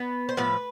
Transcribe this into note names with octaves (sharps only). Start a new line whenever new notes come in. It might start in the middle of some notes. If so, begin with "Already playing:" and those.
Already playing: B3 B4
C5
A2 F3 B3 B4